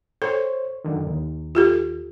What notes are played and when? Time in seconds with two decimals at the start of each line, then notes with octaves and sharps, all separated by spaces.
0.22 A4 C5 C#5
0.84 F#2 D3 D#3
1.07 D#2
1.55 F4 G4 A4